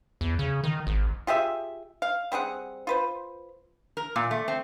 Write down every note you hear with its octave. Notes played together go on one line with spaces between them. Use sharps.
E2
C#3
D#3
G#1
F4 G4 G#4 E5
F5
G3 C4 G#4 F#5
F4 B4 C5
A#4
A#2
A3
C4